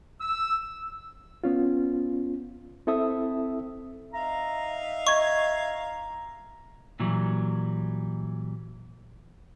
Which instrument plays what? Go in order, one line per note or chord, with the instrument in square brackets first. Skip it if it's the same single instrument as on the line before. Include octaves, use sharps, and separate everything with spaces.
[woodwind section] E6
[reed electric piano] B3 C#4 F4
C4 E4 A4 E5 D#6
[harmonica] D#4 E5 F5 [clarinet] A#5
[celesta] D#5 G#6 [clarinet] A#5 [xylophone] C#6
[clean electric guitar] A#2 E3 F#3 G3